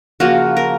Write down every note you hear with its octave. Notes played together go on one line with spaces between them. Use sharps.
C#3 F3 A#3 F#4
A#4